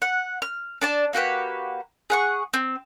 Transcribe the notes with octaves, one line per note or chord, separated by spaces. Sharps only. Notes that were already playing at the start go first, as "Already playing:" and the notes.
F#5
F6
D4 D5 A5
A#3 F#4 G4 B4
G#4 F#5 C#6
C4